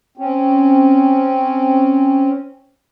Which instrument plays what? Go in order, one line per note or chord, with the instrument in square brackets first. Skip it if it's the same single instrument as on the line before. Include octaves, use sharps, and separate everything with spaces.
[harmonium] C4 C#4